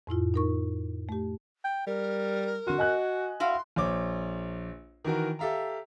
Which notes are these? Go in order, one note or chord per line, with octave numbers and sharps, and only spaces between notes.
F2 A2 E4 F4
D#4 A#4 C#6
A3 G4
G5
G3 A#4
D3 F#4 C6
D#5 G#5 F#6
E4 F#4 F5 C6
A#1 C5 C#5 D6
D#3 E3 F#4 A#4
G4 A4 E5 F5 A#5